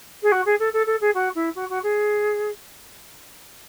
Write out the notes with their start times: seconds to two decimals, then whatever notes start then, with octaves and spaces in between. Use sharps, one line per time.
0.22 G#4
0.31 F#4
0.45 G#4
0.59 A4
0.73 A4
0.86 A4
1.01 G#4
1.14 F#4
1.35 E4
1.55 F#4
1.69 F#4
1.83 G#4